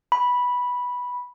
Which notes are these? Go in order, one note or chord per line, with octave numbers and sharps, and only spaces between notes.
B5